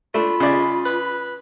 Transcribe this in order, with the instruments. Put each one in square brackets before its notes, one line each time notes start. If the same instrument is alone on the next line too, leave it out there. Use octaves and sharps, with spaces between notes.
[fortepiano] A3 [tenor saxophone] D4 [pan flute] F4 [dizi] B5
[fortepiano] C#3 D5 [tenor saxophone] G#3
[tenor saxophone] B4